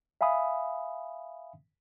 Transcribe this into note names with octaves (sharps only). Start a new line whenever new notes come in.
E5 F5 G#5 B5 D#6